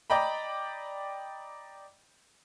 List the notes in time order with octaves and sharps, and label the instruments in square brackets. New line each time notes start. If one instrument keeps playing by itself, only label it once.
[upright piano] D5 D#5 G5 A#5 B5